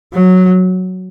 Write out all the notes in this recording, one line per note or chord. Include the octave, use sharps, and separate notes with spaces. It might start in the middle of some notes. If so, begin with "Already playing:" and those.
F#3